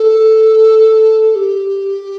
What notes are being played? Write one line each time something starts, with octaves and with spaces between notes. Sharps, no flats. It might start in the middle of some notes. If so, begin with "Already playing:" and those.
Already playing: A4
G4